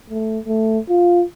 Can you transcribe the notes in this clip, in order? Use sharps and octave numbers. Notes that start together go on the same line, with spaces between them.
A3
A3
F4